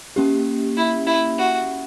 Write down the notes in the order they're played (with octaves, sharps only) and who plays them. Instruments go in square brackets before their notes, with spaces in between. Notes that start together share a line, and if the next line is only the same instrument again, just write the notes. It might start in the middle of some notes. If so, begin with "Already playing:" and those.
[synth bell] A#3 C#4 G4
[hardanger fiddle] E4
E4
F#4